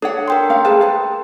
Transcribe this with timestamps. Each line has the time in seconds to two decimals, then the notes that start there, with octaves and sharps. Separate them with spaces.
0.02 D4 A4 C#5 F#5
0.28 A#4 G5 C6
0.50 C#4 F5
0.65 G#4 B4 A5
0.81 B4 A5